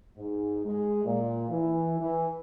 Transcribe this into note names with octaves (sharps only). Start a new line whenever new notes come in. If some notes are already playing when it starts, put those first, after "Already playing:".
G#2
G#3
A#2
E3
E3